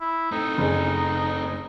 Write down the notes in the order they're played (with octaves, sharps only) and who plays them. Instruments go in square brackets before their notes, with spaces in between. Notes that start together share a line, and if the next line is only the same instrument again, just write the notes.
[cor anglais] E4
[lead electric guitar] A3 C4 [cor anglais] D#4
[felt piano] F#1 G#4